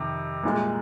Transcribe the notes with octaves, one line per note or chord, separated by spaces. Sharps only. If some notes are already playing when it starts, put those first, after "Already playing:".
Already playing: F2 C3 D#3
C2 A#2 G#3